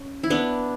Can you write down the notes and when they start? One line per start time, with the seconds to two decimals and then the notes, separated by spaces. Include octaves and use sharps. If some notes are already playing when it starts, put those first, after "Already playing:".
Already playing: C#4
0.23 E4
0.30 B3 D4